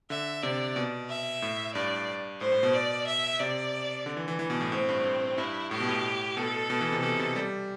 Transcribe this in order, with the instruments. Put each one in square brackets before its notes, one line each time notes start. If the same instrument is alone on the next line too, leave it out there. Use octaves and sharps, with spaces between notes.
[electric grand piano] D3 [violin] E5
[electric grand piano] C3 [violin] D5
[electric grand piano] B2
[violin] E5
[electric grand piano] A2
[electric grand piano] G2 [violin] D5
[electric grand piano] A2 [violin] C5
[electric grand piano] A2
B2
[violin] D5
E5
[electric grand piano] C3 [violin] D5
[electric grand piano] D3
E3
E3
E3
B2
A2
[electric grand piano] A2 [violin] C4
[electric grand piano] G2
A2
[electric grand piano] G2 [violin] E4
[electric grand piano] A2 [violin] G4
[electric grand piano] B2
A2
[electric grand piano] B2 [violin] A4
[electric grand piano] B2
E3
C3
[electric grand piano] B2 [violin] A4
[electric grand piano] C3
G3